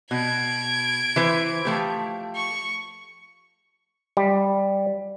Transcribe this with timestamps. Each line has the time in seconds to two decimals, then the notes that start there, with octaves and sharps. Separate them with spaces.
0.11 B2 G#6 D7
1.16 E3 B4 C5
1.65 F3 A3 G4
2.36 C#6
4.17 G3